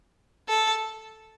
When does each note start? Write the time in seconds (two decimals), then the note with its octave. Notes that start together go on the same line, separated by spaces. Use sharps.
0.48 A4